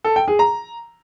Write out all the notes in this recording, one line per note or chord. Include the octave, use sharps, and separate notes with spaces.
A4
G5
G#4
A#5